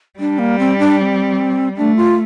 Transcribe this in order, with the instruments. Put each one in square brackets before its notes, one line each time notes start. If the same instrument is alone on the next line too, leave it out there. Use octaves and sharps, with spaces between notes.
[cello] G3 [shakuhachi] D4
[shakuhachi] A#3
C4
D4
D4
C4
[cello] A3 [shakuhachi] D4
[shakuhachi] F4